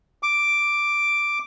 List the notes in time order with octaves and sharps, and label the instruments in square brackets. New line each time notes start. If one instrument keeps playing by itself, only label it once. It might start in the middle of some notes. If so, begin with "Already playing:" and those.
[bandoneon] D6